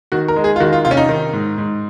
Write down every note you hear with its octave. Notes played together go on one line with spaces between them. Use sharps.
D#3 F#4
A#4
G#3
G#4
F4
D#3 F#4
F4
C3 F4
C#4
D#4
D#3
G#2
G#2